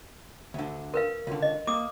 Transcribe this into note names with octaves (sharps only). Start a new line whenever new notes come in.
D2 D3
A#4 B4 F5
C#2 D3
D#5
A#3 D6 D#6